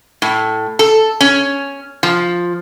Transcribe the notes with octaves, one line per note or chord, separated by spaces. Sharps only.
A2
A4
C#4
F3